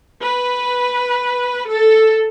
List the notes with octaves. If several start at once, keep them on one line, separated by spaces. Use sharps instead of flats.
B4
A4